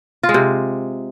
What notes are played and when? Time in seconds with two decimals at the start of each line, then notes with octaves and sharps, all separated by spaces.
0.23 F4
0.29 G#3
0.34 C3